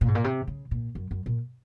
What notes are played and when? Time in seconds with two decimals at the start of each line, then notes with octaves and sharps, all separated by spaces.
0.01 A#2
0.08 G#2
0.15 A#2
0.24 C3
0.47 C#3
0.71 A#2
0.95 F#2
1.11 F#2
1.26 A#2